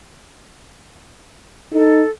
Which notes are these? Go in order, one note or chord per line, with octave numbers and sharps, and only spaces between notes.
D#4 A4